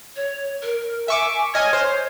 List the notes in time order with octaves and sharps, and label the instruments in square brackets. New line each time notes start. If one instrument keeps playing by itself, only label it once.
[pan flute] C#5
A#4
[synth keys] E5 C#6 D6 [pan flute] G#5
[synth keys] C#5 D#5 G#5 [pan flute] F6
[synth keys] C5 [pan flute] C#5